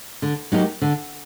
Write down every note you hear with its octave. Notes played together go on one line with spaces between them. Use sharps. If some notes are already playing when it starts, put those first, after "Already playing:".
D3
F#3 A#3 D#4 G4
D3